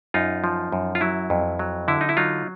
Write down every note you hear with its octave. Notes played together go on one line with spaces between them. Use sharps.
F#2 D#4 F4
F3
F#2
F4
F#3 E4
F2
F#3
D3 E4
D#4
E4
F#3 D#4 F4